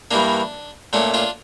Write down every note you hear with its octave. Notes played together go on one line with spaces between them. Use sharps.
G2 E3 A#3 D4
A#2 A3 C#4 D4
D4 F4